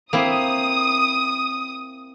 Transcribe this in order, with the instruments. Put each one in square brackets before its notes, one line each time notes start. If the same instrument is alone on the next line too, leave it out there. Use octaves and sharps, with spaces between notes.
[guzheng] A#3 C4 E4 [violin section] D#6